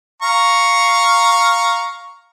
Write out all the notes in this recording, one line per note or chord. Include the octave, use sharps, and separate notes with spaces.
F5 A#5 C#6